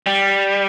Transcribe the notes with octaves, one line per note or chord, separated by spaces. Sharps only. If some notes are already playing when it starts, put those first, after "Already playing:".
G3